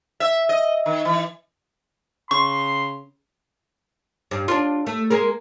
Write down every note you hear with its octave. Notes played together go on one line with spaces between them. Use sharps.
E5
D#5
D#3
E3
C#3 C6 C#6
G2
D4 F4
A3
G#3 A#3 A#4